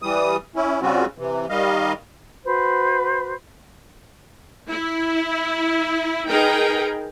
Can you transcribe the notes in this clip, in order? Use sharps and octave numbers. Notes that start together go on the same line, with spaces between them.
E3 G3 D#6
C#4 E4
C#3 G3 C4 C#4 F4 F#4
C3 E3
D#3 G3 D#5 F5
F#4 B4 C5
E4
D#4 G#4 A#4 B4 G5